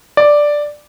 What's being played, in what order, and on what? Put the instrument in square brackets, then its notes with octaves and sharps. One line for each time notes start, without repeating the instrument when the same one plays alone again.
[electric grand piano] D5